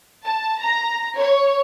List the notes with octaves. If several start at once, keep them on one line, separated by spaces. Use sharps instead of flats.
A5
A#5
C#5